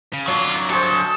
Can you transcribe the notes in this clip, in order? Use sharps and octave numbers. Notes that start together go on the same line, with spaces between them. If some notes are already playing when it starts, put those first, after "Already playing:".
C#3
F#3 D4 F4 C#5
F#4 G#4 A4 C5